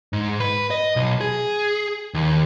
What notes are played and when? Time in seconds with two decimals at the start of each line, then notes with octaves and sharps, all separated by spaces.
0.13 G#2
0.40 B4
0.71 D#5
0.96 B1
1.21 G#4
2.14 D#2